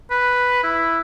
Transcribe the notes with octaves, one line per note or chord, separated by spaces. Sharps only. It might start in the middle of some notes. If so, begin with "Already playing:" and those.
B4
E4